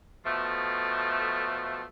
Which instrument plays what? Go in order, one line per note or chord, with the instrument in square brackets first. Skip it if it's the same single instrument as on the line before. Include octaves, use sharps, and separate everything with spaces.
[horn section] B2 F3 A3